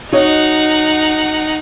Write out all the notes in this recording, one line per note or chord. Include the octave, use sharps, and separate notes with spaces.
D#4 F#4 C#5 D#5 F#5